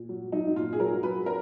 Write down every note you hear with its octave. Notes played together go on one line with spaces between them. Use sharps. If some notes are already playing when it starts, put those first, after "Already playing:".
Already playing: A#2
F#3
F#3 D#4
A#2 F4
G#4
F#3 A#4
F#3 B4
A#4